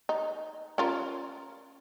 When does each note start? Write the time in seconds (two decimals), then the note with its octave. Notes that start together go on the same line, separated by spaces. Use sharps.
0.09 D#4
0.78 C#4 F4 A#4